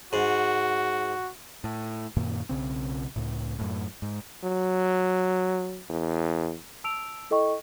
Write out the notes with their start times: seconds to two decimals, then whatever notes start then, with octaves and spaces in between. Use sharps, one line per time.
0.13 G#2 F#4
1.64 A2
2.17 F#2 A#2 D#3 A#3
2.49 B1 C#3 C4
3.16 C#2 A2
3.59 F#2 A2
4.02 G#2
4.43 F#3
5.90 E2
6.84 A5 E6 D7 F7
7.31 E4 A4 D#5 G5 C#6